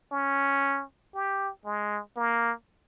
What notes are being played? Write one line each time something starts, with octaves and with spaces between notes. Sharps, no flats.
C#4
G4
G#3
A#3